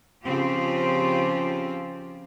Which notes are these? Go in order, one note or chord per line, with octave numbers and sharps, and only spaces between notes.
C#3 F3 C4 F4 G4